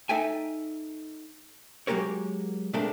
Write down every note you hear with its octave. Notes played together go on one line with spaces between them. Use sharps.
D#4 A4 E5 G5 G#5
F#3 G#3 A#3 G4 A#4 C#5
A#2 G#3 A3 C4 D4 A#4